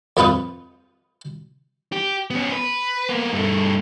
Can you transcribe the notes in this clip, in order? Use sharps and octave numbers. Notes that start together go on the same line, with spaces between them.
F2 B3 F4 B4 D#6
G4
B3 C#4
B4
A#3 B3
G2 A3